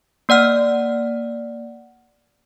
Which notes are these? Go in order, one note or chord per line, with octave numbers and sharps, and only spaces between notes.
A#3 D5 F#5 F6